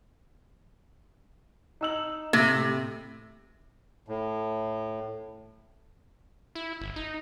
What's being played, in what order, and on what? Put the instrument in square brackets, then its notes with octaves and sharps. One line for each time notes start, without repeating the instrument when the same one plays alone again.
[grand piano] D#4 E6 F#7
[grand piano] A2 [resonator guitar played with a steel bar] C3
[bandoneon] A2
[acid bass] E4
G1
D#4